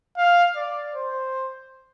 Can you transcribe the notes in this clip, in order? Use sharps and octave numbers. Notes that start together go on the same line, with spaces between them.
F5
D5
C5